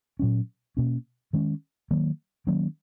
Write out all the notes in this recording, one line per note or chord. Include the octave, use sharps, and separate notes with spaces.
A#2 F#3 C#4
B2 A#3 C#4
D#3 G#3 C#4
D#3 F#3 A#3
D#3 F#3 A#3 C#4